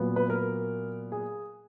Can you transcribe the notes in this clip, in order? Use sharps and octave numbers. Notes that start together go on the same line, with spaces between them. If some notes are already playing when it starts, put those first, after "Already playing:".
Already playing: A#2 F#3 B3
B4
A#4
G#4